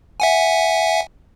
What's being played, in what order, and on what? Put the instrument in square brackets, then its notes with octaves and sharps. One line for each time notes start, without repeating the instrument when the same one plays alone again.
[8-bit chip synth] E5 F#5 G#5